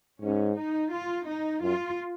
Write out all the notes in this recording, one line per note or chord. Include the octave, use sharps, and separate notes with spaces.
G#2 C#4
D#4
F4
D#4
F#2 F4